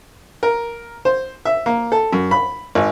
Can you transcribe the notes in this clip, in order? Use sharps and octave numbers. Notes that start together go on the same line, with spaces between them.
A#4
C5
E5
A#3
A4
F#2
B5
G#1